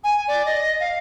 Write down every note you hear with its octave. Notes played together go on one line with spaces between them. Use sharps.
G#5
D5
D#5
F5